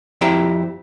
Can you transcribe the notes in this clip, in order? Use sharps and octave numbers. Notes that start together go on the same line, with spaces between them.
F2 C4 E4 G4 G5 A#5